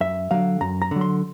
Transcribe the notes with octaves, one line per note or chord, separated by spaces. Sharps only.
F#2 E5
D3 F#3 F5
F#2 A#5
A#5
D3 F#3
C6